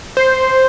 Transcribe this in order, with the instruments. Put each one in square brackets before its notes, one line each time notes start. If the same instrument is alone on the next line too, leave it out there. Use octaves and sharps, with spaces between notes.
[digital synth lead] C5